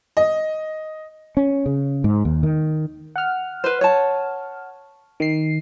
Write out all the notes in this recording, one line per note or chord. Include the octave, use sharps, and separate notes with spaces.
D#5
C#4
C#3
G#2
D#2
D#3
F#5 F6
B4 C5
C#5 A5
D#3 C7